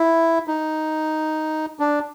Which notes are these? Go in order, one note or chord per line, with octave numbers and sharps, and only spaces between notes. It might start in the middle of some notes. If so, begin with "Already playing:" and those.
Already playing: E4
D#4
D4